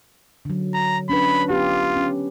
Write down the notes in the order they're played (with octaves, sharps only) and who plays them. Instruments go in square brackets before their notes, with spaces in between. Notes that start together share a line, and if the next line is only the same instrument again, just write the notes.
[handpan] D3 F#3
[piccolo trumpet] A#5
[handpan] C#4 D4 B4 [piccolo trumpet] B5
[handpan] B3 G4 [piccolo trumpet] F4
[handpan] C#4